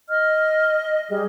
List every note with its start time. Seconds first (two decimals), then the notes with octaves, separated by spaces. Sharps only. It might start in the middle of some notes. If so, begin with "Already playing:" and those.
0.09 D#5 F6
1.10 G3 G#4